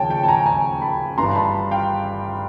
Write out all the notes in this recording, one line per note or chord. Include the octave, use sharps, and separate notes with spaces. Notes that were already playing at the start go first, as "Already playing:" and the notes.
Already playing: D#2 C#3 F3 C#5 G5 A5
G5 A5
A5
G#5 A#5
G#5 A#5
A5 B5
G1 G2 E3 A#5 C6
A5 B5
F5 G5